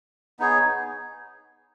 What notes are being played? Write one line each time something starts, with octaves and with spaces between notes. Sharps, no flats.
B3 D#4 G#4 C#5